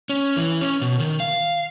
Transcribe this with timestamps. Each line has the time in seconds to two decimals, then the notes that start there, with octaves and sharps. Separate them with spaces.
0.10 C#4
0.37 E3
0.61 C#4
0.82 B2
1.00 D#3
1.20 F5